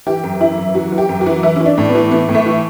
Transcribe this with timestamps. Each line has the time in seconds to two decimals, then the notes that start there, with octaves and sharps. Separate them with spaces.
0.06 E3 G4
0.24 F#2
0.41 E3 E4
0.58 F#2
0.75 E3 F#4
0.92 E3
0.98 G4
1.09 F#2
1.21 F#4
1.26 E3
1.43 E3 E4
1.56 E3 C#4
1.66 D4
1.78 A2
1.89 B3
1.95 E3
2.11 E3 B3
2.29 A2
2.35 A3
2.46 E3